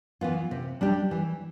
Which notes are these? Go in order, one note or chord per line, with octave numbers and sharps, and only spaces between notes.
E3 B3 F4
C3
G3 D4 G4
E3